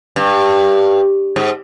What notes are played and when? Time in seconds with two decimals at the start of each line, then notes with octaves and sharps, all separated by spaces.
0.16 G2
1.36 G#2